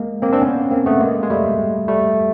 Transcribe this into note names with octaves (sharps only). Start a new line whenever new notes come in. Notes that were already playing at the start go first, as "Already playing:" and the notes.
Already playing: G#3 A#3
A#3 C4
C4 D4
B3 C#4
A#3 C4
A3 B3
G#3 A#3
G#3
G3 A3
G3 A3